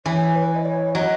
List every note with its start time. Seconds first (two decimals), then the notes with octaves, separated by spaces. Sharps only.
0.06 E3 C#5
0.35 B4
0.55 D#5
0.65 C#5
0.94 F#3 D#5